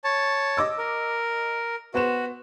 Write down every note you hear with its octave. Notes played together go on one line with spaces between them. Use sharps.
C#5 A5
D#5 D6 E6
A#4
B3 F#4 C5 E7